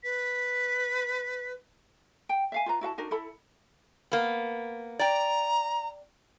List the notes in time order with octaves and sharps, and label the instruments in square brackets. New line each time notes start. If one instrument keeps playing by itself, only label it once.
[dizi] B4 [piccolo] B6
[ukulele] G5
E5 F5 G#5
F4 B4 A#5
E4 F#4 F5 A5
D4 D#4 F#4 A#4
E4 A4 B5
[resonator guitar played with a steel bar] A#3 B3
[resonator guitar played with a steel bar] D5 G5 [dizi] A#5